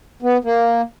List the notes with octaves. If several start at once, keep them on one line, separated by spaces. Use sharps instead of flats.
B3
A#3